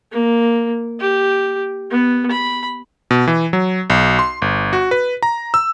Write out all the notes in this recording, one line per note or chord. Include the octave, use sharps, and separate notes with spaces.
A#3
G4
B3
B5
B2
E3
F#3
B1
C6
G1
F#4
B4
A#5
E6